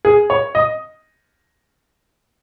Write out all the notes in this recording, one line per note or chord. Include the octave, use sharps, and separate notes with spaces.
G#4
C#5
D#5